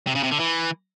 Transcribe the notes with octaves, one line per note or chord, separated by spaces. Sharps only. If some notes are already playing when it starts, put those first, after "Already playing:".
C3
C#3
C3
D3
E3